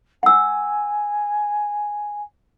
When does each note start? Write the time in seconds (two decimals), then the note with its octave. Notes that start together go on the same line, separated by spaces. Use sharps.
0.23 F#5 G#5 E6